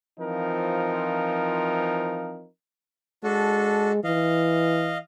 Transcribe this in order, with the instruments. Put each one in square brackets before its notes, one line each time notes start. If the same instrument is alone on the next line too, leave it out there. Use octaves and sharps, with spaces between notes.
[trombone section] E3 F3 C4 D#4 F4 A#4
[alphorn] G#3 [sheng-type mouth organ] D4 F#4 A4
[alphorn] E3 [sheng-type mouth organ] D#5 F5